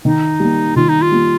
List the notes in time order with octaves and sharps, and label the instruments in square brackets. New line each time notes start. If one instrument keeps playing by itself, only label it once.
[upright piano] D#3 [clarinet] D#4
[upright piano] G3 A#3
[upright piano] D#3 [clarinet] F4
[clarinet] D#4
F4
[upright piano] G3 A#3